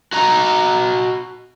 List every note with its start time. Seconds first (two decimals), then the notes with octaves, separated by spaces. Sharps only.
0.13 F#4 D#5 A#5